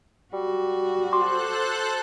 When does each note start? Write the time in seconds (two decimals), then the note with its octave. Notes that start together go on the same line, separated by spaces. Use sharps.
0.33 G3 F#4
1.13 A4 C5 C6 D6 F#6